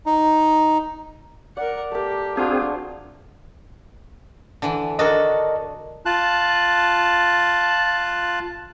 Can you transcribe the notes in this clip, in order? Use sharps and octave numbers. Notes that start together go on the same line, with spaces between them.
D#4
A#4 D5 F#5
A3 G4 A#4
C4 D4 F4 F#4 G#4
D3 E3
D4 F#4 A4 A#4 D#5
F4 A5 F#6